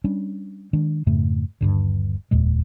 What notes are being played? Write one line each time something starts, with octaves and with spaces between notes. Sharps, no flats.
G3 C#4 D4
D#3 G#3 D4
F2 G#2 C#3 A3
D#1 G#1 G2 D3
F1 D#2 A#2 G#3